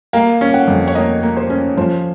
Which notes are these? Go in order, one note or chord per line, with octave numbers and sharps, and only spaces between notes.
A#3 F5
C#4
F#5
F2
C#5
A#3 D#5
A#3
C5
C#4
F3 C5